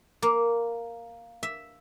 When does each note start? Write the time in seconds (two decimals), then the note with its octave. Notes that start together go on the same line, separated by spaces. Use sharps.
0.22 A#3
1.43 E5